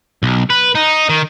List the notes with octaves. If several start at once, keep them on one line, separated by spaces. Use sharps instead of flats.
B1
B4
D#4
D#3